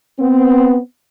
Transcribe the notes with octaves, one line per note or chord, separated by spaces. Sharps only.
B3 C4